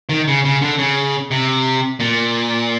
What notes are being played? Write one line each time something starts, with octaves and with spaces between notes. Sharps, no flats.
D#3
C#3
C#3
D3
C#3
C3
A#2